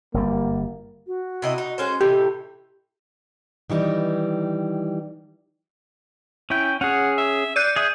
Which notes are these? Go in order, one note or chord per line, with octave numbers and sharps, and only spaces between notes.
G1 F#2 G3 A#3
F#4
C3 E4 D#5
D#4
G#3 C#4 C5
A2 C3 E3 G4 D#5
D#3 E3 G3 D#4
C#4 E4 G5
C#4 G#4 F#5
E5
D5 F#6 G6 D#7
G#4 E5 D#6